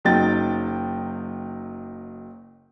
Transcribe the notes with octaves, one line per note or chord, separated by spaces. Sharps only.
F#1 F#3 D#4 G5 A6